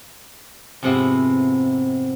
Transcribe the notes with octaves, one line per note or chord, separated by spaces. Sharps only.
F2 G#2 C3 B3 C4 E4